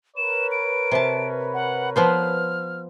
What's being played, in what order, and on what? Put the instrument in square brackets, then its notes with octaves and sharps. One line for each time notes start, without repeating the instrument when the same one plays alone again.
[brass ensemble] A#4 B4 C#5 [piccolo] E7
[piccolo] D7
[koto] C3 A5
[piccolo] F#5
[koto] F3 B3 C5 [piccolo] F6